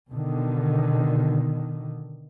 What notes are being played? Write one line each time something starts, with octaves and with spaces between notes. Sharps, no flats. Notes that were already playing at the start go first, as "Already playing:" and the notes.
B2 D3 D#3